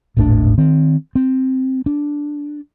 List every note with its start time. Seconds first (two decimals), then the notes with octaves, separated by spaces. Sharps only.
0.17 D#1 G#1 A2 D4
0.58 D#3 C4
1.15 C4
1.86 D4